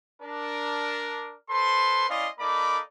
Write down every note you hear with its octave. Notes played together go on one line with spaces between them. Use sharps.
D4 A#4
A4 B4 C5 C6
C#4 E4 D5 D#5 F5 C6
A#3 D#4 A4 D5 B5 D6